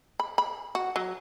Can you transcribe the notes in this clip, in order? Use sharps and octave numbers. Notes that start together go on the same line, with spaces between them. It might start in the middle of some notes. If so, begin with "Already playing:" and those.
B5
B5
F#4
F#3